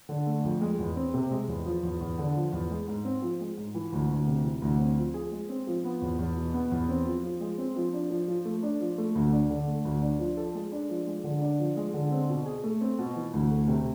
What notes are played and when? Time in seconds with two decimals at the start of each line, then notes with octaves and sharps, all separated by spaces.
0.09 D3
0.27 A3
0.44 F2
0.61 G#3
0.79 E2
0.96 C4
1.14 C3
1.31 G#3
1.48 E2
1.66 F3
1.83 E2
2.01 E2
2.18 D3
2.36 F3
2.52 E2
2.70 G#3
2.88 G#2
3.05 C4
3.22 F3
3.40 G#3
3.57 G#2
3.75 E3
3.92 D2
4.09 D2
4.27 C3
4.44 E3
4.62 D2
4.79 C4
4.97 F3
5.14 G#4
5.32 G#3
5.49 C4
5.67 F3
5.84 B3
6.02 E2
6.19 E2
6.36 B2
6.54 B3
6.71 E2
6.89 C4
7.06 F3
7.23 F3
7.40 G#3
7.58 C4
7.76 F3
7.93 D4
8.10 F3
8.28 F3
8.45 A3
8.63 D4
8.80 F3
8.98 A3
9.15 D2
9.32 D4
9.50 D3
9.68 A3
9.85 D2
10.02 D4
10.19 F3
10.37 A4
10.55 G#3
10.72 D4
10.89 F3
11.07 G#3
11.24 D3
11.42 D4
11.59 F3
11.76 G#3
11.94 D3
12.12 C4
12.29 B2
12.46 G#4
12.64 A3
12.81 C4
12.99 B2
13.16 E3
13.33 D2
13.51 A3
13.68 C3